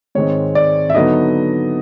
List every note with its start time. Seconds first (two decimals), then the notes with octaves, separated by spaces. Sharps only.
0.15 G#2 D#3 G#3 C4 C#5
0.55 D5
0.90 E5
0.95 D3 F#3 B3 D#4 D#5